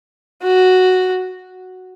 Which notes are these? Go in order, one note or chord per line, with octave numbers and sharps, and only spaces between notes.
F#4